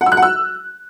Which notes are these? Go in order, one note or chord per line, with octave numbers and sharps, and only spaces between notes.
F#5
E6
F#6
F#5
E6